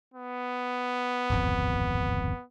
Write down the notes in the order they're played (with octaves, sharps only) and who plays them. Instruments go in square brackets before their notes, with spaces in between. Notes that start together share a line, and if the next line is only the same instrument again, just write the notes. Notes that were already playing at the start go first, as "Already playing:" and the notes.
[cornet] B3
[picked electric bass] D1 G#1 F2